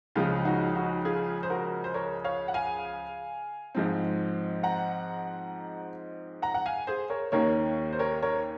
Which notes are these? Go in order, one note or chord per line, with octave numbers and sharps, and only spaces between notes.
C#2 C#3 F3 G#3 F4
D#4 F#4
D#4 F#4
F4 G#4
C5
F#4 A#4
C5
A#4 C#5
C#5 F5
F#5
F5 G#5
G#2 F3 G#3 C4
F#5 A#5
F#5 A#5
F#5
F5 G#5
G#4 C5
A#4 C#5
D#2 D#3 A#3 C#4 A#4 C#5
C5
A#4 C#5
A#4 C#5